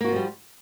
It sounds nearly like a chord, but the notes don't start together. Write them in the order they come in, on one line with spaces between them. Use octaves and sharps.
A#3 F#4 F4 F3 G3